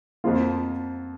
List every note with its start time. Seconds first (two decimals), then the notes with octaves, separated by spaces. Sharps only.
0.24 F2 F3 A#3 F4